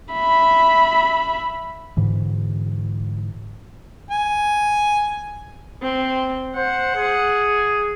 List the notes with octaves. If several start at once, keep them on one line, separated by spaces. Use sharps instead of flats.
E5 B5
G#2 D3 E3
G#5
C4
C5 F#5
G#4